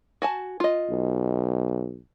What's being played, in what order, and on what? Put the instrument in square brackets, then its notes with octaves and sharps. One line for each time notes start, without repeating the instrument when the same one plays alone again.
[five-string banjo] F#4 G#5 A5
F4 D#5
[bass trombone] B1